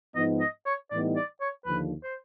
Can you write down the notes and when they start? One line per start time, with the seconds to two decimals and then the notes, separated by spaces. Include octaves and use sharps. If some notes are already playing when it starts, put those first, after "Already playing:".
0.15 G#2 F3 G#3 B3 D#4 D#5
0.40 D#5
0.66 C#5
0.91 A2 E3 G3 B3 D#4 D5
1.16 D5
1.41 C#5
1.66 D#2 D3 F3 B4
2.03 C5